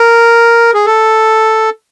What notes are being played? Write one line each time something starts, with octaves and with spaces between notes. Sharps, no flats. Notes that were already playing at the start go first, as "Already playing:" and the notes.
Already playing: A#4
G#4
A4